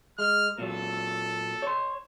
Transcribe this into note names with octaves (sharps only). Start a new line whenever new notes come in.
G#3 F6
A#2 F#3 A4
C#5 C6